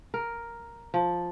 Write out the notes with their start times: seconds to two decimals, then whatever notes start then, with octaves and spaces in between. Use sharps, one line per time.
0.14 A#4
0.94 F3